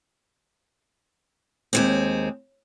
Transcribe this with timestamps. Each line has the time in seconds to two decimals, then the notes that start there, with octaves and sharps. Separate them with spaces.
1.73 D#2 G#3 C4